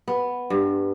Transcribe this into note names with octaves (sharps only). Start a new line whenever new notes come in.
B3
G2